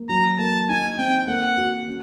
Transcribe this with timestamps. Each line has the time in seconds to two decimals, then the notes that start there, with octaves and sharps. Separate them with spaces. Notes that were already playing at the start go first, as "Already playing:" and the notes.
Already playing: A#3
0.09 F#3 A#5
0.39 A#3 A5
0.69 D#4 G#5
0.98 C4 G5
1.27 A#3 F#5
1.57 F#4
1.88 C#4